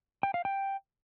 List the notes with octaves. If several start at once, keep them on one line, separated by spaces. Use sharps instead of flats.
G5
F5
G5